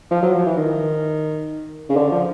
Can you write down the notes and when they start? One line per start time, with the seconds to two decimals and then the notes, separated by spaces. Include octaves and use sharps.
0.11 F3
0.23 F#3
0.34 F3
0.46 E3
0.57 D#3
1.89 C#3
1.96 D3
2.12 F3